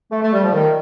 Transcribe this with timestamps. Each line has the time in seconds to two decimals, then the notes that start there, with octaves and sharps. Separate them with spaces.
0.11 A3
0.22 A3
0.32 G3
0.43 F3
0.53 D#3